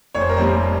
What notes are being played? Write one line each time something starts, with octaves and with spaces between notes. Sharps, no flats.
F1 C#5
C5
A#4
F2 C3 G3 A#3 C5